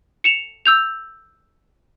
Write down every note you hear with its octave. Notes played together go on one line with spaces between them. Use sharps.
C#7 E7 F7
E6 G6 F7